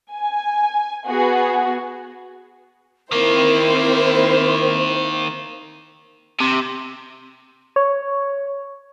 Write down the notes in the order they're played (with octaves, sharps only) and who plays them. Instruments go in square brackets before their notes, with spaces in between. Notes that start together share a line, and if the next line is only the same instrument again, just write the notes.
[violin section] G#5
B3 F#4 G#4
[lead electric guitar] D#3 A#3 [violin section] C4 E4 C5 [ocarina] A#4
[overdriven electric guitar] C3
[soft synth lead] C#5